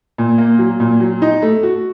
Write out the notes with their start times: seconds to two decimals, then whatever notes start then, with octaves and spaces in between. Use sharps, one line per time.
0.18 A#2
0.38 A#3
0.59 F#3
0.80 A#2
1.00 F#3
1.22 D#4
1.42 A3
1.63 F#4